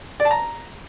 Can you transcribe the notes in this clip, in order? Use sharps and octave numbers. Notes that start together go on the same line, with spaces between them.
D5
A5
A#5